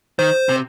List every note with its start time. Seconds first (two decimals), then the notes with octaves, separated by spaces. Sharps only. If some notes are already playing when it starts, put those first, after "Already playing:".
0.19 D#3 C5
0.49 C3